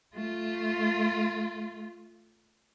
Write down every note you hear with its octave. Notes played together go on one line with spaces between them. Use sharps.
A3 F4